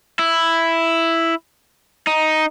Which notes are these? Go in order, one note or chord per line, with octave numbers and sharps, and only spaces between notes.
E4
D#4